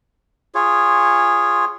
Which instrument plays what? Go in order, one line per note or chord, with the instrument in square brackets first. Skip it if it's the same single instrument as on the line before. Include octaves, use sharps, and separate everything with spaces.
[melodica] F4 G#4 C#5